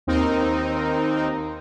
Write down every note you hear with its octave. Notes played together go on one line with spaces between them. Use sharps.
D#2 C4 D#4 A#4